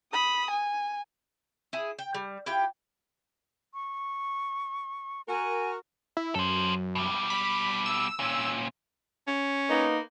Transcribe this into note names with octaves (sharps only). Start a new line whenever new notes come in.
B5 D#6
G#5
E4 G#4
G5
G3
E4 F4 G4 G5
C#6
F#4 A#4 G#5
E4
F#2 A4 C5
B2 G3
B5
E6
A#2 C#4
C#4
A#3 B3 D#4